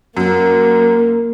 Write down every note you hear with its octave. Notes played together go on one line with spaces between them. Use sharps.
F#2 A#3